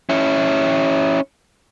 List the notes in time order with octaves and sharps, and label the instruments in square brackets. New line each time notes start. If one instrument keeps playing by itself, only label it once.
[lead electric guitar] C#4 E4